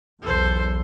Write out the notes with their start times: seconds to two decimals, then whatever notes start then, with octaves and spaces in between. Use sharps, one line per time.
0.22 B1 E2 A4 C5